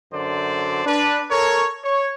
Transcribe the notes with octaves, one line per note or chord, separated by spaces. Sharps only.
F#2 D3 C5 D5
D4 B4
A4 A#4 C#5
C#5